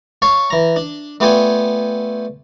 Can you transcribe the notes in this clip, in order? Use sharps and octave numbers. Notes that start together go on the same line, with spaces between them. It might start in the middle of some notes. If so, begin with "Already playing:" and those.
C#5 F5 A5 C#6
E3 A#5
D4
A3 B3 F4 D5 G5 G#5